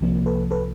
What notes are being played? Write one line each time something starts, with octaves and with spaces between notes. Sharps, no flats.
C2 C3 F3 A#3
A4 B4
A4 B4